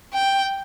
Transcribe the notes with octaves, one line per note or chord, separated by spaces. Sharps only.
G5